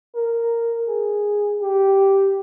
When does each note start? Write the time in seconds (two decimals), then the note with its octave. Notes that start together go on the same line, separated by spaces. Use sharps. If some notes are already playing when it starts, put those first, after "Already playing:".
0.15 A#4
0.88 G#4
1.61 G4